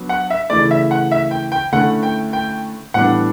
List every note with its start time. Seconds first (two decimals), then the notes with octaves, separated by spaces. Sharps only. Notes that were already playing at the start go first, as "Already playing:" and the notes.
Already playing: F#3 B3 D4
0.09 F#5
0.30 E5
0.50 C#3 E3 A3 D5
0.71 E5
0.91 F#5
1.12 E5
1.31 G5
1.52 G5
1.72 D3 A3 C#4 E4 F#5
2.03 G5
2.33 G5
2.94 A2 E3 G3 B3 D4 F#5